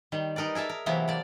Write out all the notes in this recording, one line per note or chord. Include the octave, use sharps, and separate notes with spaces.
D#3 G3
D#4 A#4 B4 D5
G#4 A#4 E5 A5
A#4
C3 E3 F#3 A#3 B3
A#3 D5 A5